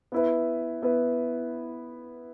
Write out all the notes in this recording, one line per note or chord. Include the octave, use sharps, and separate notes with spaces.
B3 E4 B4
B3 E4 B4